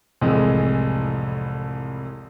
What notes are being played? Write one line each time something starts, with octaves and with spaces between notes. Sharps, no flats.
C2 F2 A2 C3 E3 G#3